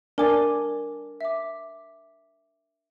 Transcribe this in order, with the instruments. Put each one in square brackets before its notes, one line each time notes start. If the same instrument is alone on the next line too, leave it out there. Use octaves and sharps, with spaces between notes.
[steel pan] D4 G#5 [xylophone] A#4 D6 A6
[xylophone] E5 D6